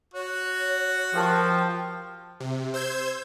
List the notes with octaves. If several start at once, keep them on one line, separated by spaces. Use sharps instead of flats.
F#4 C#5
F3 G4 A#4 G5 A5
C3
C5 E6 G6 G#6